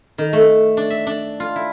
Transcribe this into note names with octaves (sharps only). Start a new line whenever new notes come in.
D#3
A3
D4
E5
D4
F4
E4